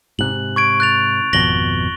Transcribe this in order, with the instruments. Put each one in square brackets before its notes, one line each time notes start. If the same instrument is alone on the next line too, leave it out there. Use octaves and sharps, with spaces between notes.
[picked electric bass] G#2 C3 [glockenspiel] F#6 F#7
[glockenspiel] C#6 G#6 D7
F#6 A6 F7
[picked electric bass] G#1 F2 B2 [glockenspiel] A#6 F#7 G7